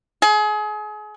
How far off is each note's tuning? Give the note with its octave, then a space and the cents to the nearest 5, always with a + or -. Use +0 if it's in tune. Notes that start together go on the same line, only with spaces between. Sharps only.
G#4 +30